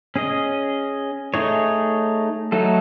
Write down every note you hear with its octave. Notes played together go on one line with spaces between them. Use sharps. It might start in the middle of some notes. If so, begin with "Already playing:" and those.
C#4 G#4 D#5
A3 D#4 G#4 C#5
F#3 A3 D#4 A4